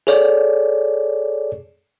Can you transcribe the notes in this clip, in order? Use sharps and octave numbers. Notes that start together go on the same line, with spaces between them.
G#4 A4 C#5 D5